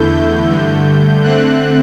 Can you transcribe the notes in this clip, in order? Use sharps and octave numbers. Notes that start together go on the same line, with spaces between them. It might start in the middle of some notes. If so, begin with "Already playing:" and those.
Already playing: E2 D3 A3 E4 G6
G2 D3 A3
D3 A3 C4 F#6